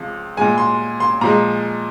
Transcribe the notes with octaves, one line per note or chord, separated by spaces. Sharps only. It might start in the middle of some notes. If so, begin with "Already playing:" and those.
Already playing: C#2 C3 F3
A#2 G#3 G#5
C6
C6
A#2 F3 G#3 A#5